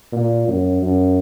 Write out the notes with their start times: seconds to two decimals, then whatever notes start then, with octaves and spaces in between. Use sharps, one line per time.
0.12 A#2
0.48 F#2
0.82 F#2